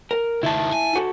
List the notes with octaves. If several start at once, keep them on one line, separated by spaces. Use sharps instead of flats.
A#4
C#2 D#3 E4 A5
G#5
F#4 A4